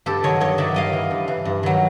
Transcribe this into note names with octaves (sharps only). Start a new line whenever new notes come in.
G2 G4 A4
D#3 F#3 C#5 D#5
G2 C#5 D#5
D#3 F#3 D5 E5
G2 D#5 F5
E3
G2
E3
G2
D#3 F#3